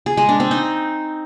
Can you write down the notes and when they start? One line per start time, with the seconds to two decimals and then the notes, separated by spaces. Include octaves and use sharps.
0.06 G#4
0.17 G#3
0.29 D4
0.40 C4
0.51 D#4